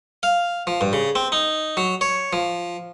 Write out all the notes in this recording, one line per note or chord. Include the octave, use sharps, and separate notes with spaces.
F5
F3
G2
C#3
C4
D#4
F#3
C#5
F3